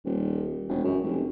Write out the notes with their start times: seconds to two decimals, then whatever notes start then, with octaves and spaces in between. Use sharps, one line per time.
0.05 D#1
0.68 E1
0.84 F#2
1.03 F1